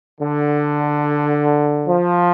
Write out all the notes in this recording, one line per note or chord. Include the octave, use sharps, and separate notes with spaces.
D3
F3